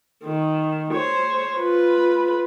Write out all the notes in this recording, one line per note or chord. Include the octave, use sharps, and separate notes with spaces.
D#3
C5 C#5
F4 B4